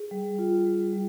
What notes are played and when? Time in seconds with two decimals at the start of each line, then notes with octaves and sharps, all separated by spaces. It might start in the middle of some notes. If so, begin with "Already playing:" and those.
Already playing: G#4
0.11 G3
0.39 F4
0.66 G3
0.93 G3